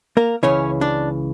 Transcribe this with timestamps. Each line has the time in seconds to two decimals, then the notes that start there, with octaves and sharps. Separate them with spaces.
0.17 A#3 A#4
0.43 C#2 C#3 E3 C#4 C#5
0.81 D4 D5